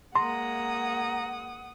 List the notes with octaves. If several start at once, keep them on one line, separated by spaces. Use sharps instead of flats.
G#3 A#3 F#5 A#5 C6 D#6